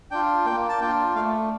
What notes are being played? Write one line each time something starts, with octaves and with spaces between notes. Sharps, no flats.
D4 F4 G5
A#3 G5
A5
D4 F4 G5
A3 F5